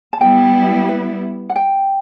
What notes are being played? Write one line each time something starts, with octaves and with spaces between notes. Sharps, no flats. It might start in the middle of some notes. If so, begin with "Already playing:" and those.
A5
G3 B3 E4 G5
B4
F#5
G5